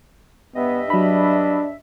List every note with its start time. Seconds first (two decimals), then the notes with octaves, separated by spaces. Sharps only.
0.56 G2 B3 D#5 E5
0.90 F#3 D4 B5